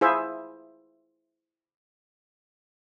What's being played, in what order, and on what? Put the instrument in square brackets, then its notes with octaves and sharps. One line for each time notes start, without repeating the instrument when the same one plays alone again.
[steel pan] E4 F4 G#4 C5 E5